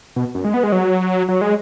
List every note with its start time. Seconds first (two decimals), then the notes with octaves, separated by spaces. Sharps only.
0.16 B2
0.35 F#2
0.44 G#3
0.54 B3
0.63 G#3
0.72 F#3
1.29 F#3
1.41 G#3